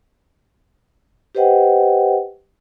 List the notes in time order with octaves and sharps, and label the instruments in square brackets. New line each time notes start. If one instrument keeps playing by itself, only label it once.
[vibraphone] G4 B4 C5 D#5 F#5 G5